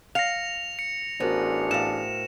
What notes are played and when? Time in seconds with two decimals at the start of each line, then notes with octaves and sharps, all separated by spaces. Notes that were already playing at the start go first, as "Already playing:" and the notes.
0.15 F5 A#6 C#7 F7
0.79 C#7
1.20 A1 B3 D4 F#4 G#4 A#4 C5
1.71 A2 F5 E7